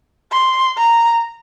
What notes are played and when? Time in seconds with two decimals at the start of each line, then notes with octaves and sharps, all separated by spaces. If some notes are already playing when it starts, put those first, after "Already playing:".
0.32 C6
0.78 A#5